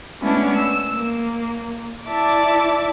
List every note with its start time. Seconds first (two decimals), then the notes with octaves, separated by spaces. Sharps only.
0.20 G#3 A3 B3 C#4 D4 E4
0.55 E6
0.94 A#3
2.08 E4 D5 E5 A5 D6